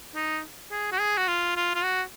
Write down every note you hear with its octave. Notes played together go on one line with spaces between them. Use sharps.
D#4
G#4
F#4
G#4
F#4
F4
F4
F4
F#4